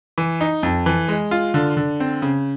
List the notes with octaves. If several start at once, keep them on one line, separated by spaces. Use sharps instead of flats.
E3
D#4
F2
E3
G#3
F4
D3
D3
C4
C#3